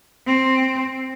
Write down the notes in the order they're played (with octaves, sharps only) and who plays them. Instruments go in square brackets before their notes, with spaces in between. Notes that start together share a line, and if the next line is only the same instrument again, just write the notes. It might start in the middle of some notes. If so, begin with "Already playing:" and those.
[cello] C4